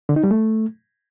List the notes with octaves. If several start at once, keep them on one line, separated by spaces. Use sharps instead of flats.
D3
D#4
G3
A3